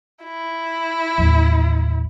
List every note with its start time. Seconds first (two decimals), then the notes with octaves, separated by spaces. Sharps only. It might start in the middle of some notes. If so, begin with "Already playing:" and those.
0.24 E4
1.18 A1 D#2 F#3